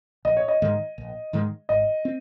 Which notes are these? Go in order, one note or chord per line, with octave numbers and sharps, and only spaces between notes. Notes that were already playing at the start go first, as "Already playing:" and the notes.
A#1 D#5
C#5
D#5
G#2 D#3 G#3
A#1
G#2 D#3 G#3
G#1 D#5
C4